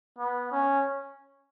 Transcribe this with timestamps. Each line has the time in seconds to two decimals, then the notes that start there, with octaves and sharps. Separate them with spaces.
0.19 B3
0.52 C#4